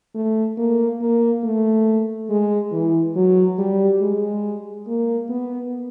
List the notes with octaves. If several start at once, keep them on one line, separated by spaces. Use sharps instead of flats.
A3
A#3
A#3
A3
G#3
E3
F#3
G3
G#3
A#3
B3